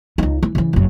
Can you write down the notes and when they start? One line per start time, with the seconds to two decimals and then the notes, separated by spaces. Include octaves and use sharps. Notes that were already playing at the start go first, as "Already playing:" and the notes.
0.18 C#2 D#4
0.43 E3
0.55 C#3 E3
0.73 F#1 F#2